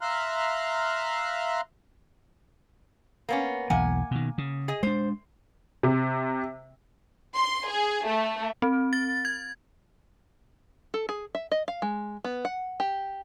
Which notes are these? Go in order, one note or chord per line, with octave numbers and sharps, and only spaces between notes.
E5 F5 A#5 C6 F6 F#6
A#3 B3 C#4
B1 E2 E3 A#3 F#5 G#5
B2 D#3
C#3
G#4 D#5
G#3 D4 C5
C3
C6
G#4
A3
C4
A6
G#6
A4
G#4
E5
D#5
F5
G#3
B3
F#5
G4